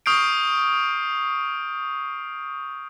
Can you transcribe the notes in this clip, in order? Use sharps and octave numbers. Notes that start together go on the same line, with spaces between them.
C#6 D#6 F6 G6 C7 D7